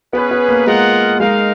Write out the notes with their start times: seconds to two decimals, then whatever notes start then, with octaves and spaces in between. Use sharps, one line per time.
0.13 B3 C#4 G#4 B4
0.31 B3
0.49 A#3
0.67 G#3 F4 A#4 D#5 F#5
1.20 G#3 D#4 A#4 F5